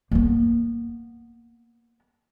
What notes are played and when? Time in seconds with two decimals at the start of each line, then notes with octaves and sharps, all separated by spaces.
0.11 A#3 B3